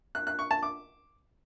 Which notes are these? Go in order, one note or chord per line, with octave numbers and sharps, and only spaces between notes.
F#6
F#6
C#6
A5
D6